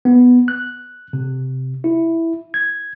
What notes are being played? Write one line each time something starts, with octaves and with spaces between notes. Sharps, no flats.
B3
F#6
C3
E4
G#6